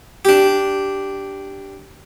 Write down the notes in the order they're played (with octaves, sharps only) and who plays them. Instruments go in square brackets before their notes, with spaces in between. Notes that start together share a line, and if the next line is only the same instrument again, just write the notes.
[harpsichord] D4 G4